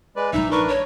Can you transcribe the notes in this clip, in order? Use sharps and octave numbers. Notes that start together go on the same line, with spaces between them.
G#3 B4 D5
A#1 F3 D#4 E5
D4 A#4 B4 C#6
C#5